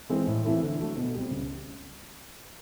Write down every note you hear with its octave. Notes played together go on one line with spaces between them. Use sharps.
E3 G#3 C4
A2
E3 A3 C4 E4
D3
F#3 A3
B2
G3 C4
C#2